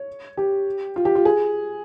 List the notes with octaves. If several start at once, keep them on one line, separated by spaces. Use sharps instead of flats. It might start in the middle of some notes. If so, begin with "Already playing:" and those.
Already playing: C#5
G4
F4
G4
F4
G#4